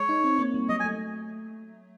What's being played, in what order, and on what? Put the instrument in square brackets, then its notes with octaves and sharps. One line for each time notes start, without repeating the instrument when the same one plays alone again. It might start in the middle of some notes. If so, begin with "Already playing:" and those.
Already playing: [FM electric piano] G#3 [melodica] C#5
[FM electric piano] D#4
C4
A#3
G3
[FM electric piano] F#3 [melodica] D#5
[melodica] G#5
[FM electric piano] A3